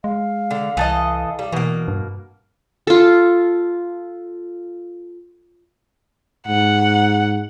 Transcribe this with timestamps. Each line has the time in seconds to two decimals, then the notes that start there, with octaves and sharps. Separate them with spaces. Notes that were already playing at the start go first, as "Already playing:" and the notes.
0.04 G#3 F5
0.51 D3
0.77 C2 E3 A4 D#5
1.39 G3
1.52 B2 E3 A#3
1.88 G2
2.87 F4 A4
6.47 G#2 F#5